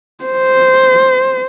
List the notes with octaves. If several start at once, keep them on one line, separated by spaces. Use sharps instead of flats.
C5